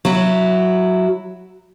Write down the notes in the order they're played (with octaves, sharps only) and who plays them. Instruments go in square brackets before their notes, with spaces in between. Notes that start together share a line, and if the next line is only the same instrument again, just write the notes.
[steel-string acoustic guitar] F#3 E4